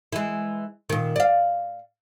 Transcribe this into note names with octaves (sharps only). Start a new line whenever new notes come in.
E3 G#3
A#2 D#3
D5 F5